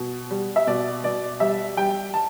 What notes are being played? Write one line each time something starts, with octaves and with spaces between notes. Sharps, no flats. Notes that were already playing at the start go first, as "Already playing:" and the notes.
Already playing: B2
G3
E5
B2 D5
B2 D5
G3 E5
G3 G5
A5